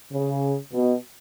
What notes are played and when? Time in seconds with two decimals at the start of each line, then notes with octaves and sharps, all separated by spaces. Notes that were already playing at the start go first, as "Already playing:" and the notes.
0.12 C#3
0.72 B2